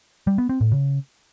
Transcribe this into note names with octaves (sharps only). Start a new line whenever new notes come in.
G3
B3
C4
A2
C#3